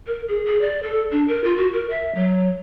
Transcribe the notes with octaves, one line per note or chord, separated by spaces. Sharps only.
A#4
G#4
G#4
D5
A4
D4
A#4
F4
F#4
A#4
E5
F#3